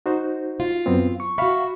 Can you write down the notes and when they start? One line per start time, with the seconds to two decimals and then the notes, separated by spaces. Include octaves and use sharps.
0.06 D#4 F#4 C5
0.60 F4
0.86 F#2 B3 C4
1.20 C#6
1.38 F#4 E5 F5 B5 C#6